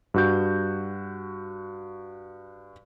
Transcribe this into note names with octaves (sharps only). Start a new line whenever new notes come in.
G2 F#4 G6